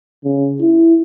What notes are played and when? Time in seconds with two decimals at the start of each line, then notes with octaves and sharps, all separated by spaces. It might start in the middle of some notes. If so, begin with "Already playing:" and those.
0.24 C#3
0.61 E4